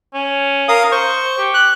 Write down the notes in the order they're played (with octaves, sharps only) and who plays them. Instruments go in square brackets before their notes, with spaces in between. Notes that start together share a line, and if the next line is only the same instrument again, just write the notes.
[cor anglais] C#4
[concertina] A#4 F5 D#6
[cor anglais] C5 [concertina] C#6
[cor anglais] G4
[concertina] F#6